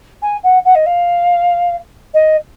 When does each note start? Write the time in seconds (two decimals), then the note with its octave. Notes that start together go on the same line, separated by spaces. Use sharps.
0.22 G#5
0.43 F#5
0.65 F#5
0.75 D#5
0.86 F5
2.14 D#5